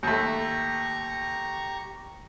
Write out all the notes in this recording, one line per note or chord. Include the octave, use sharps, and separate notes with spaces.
D#2 A3 G4 A#5 C#6